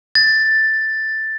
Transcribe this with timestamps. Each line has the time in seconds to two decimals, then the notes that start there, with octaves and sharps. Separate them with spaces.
0.15 A6